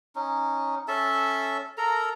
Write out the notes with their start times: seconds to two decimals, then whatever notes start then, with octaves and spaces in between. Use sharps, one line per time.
0.16 C#4 D#4
0.88 C#4 A4 E5 A5
1.78 A4 A#4 A#5